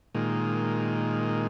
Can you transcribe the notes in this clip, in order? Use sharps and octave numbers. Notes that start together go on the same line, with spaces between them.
A#2 D#3 G#3